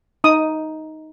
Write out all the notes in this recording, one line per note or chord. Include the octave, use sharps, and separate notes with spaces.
D#4 D#6